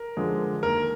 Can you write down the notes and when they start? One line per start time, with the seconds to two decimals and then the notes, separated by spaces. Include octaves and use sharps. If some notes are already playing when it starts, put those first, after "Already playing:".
Already playing: A#4
0.17 D3 F3 G#3
0.63 D#2 A#4